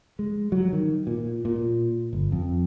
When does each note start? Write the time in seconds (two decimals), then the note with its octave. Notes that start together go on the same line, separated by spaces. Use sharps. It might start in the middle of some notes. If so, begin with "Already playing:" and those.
0.19 G#3
0.52 F#3
0.73 D#3
1.07 A#2
1.45 A#2
2.13 G1
2.32 F2